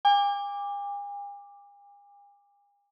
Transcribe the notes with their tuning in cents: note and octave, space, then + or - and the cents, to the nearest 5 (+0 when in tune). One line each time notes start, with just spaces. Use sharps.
G#5 -45 D6 +0